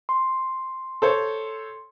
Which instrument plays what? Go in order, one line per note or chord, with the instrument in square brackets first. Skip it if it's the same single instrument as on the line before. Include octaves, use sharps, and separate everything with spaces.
[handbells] C6
[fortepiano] A4 C5 C#5